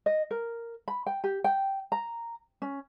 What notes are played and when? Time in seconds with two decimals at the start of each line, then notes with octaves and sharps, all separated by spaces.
0.06 D#5
0.31 A#4
0.88 B5
1.06 G5
1.24 G4
1.44 G5
1.92 A#5
2.62 C#4